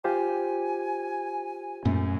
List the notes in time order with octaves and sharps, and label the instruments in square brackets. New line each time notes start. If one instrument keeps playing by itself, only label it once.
[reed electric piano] F4 G4 C5 [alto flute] G#5
[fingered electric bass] F#2 C#4 [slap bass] A#2 A3